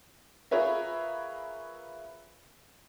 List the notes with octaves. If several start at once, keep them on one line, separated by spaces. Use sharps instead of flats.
F4 G#4 A#4 B4 C#5 E5